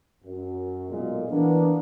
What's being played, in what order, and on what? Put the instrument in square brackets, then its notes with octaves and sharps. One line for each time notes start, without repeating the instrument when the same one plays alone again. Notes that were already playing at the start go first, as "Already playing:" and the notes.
[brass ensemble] F#2
B1 A#2 G#3
[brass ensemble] E3 A#3 B3 [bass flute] D4